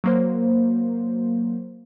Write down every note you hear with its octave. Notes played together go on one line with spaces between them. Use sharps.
F#3 A#3 C5